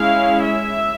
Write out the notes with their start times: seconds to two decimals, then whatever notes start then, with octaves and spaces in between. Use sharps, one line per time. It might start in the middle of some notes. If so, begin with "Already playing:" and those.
Already playing: G#3 C#4 E4 F5
0.41 E5